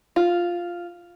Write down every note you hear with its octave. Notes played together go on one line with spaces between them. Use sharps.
F4